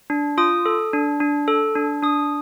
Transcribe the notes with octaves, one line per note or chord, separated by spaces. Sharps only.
D4
F4 D#6
A4
D4
D4
A4
D4
D4 D#6